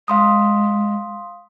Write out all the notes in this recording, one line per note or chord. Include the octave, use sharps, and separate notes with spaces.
G#3 F5 C6 D#6